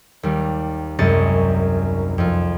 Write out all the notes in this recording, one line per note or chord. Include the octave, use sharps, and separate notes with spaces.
D#2 G3
C2 F#2 G#3 D#5 A6 C#7
F2 F4